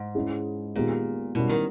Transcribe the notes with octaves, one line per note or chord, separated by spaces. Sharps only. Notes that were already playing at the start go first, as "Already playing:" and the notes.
Already playing: G#2
G#3 C#4 E4 G#4
A#2 D#3 G#3 B3 G4
B2 G3 C#4 E4 A#4
D#3